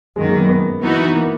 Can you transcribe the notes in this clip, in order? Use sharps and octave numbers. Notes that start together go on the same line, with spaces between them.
F#2 D#3 F#3 G#3
A#3
B3
B3
E3 B3 D#4 F#4
A#3